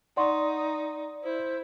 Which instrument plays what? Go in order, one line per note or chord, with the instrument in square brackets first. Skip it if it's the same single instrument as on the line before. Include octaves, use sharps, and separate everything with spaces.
[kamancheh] D#4 [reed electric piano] D5 [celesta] F#5 C6 C#6
[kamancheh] E4 [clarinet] C5